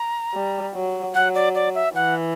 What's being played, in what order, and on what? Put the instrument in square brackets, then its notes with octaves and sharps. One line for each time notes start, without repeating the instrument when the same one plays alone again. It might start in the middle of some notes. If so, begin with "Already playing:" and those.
Already playing: [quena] A#5
[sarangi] G3
F#3
[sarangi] F#3 [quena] F#5
[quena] D5
D5
E5
[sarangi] E3 [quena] F#5